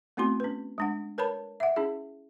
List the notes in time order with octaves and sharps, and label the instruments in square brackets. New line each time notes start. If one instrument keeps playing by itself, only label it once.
[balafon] A3 B3 C4 E4 F#4 C6
C#4 B4
G#3 D4 F#5
A#4 B4 C#5 A5 B5
E5 F#5
C#4 E4 G#4